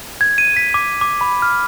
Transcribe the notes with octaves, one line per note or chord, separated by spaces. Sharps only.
G#6
D#7
B6
D6
D6
B5
F6